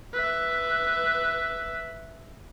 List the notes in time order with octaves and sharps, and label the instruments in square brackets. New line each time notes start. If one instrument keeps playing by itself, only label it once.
[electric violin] B4 E5